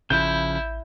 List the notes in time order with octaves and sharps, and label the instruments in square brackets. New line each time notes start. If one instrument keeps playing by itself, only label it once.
[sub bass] A1 [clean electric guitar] C#3 F3 [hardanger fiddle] E4 [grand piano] G6